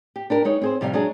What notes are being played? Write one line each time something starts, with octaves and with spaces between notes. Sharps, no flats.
G4
D4 G4 A#4
G#3 D#4 C#5
C4 G#4 C5
F2 C3 G3 F5
F#3 G#3 D4 G#4